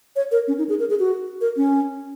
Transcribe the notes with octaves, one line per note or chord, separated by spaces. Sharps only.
C#5
A#4
C#4
D#4
G#4
A#4
G#4
F#4
A#4
C#4